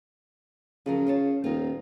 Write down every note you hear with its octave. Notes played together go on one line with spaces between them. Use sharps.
C#3 F3 F#3 A#4
F4 C#5 A5
D#1 D#4 F4